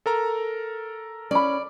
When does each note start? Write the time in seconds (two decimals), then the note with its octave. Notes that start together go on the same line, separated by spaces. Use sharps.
0.06 A4 A#4 A#5
1.31 C#4 D5 B5